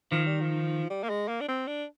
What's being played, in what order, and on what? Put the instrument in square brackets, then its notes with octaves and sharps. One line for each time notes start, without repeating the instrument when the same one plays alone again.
[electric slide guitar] D#3 [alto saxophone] F3
[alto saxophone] G3
F3
G3
A#3
G#3
A#3
D4
C4
D4